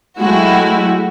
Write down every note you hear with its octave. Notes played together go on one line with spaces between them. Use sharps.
F#3 G#3 A3 E4 F#4 G4